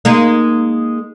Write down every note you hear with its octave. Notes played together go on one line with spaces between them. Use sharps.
G#3 A#3 D#4